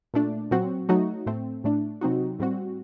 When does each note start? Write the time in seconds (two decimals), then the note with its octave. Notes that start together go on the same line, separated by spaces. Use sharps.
0.14 A#2 A3 D4
0.51 A#2 F#3 C4 F#4
0.89 F#3 A3 D#4 F#4
1.26 A2 A3 C4
1.64 A2 A3 D4
2.01 C3 F#3 C4 D#4 F#4
2.39 A2 G3 C4 F#4